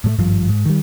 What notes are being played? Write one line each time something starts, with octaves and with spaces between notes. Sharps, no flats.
A2 F#3 A3
G#1 G2 F3
G#2
D#3 G3